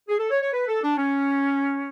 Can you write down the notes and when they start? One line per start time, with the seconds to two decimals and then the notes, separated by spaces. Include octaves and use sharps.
0.08 G#4
0.19 A4
0.31 C#5
0.42 C#5
0.53 B4
0.67 A4
0.83 D4
0.97 C#4